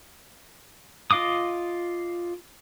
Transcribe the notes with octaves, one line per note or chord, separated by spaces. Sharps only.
F4 D#5 F5 D6 D#6